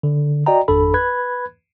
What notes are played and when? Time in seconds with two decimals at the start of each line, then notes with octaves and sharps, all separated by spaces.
0.03 D3
0.46 F#4 D5 D#5 G5 A#5
0.68 G#1 F2 D4 A4 B5
0.94 B4 B5 F#6 G#6